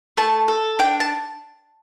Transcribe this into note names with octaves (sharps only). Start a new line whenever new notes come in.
A3 A5
A4
D4 G5
A5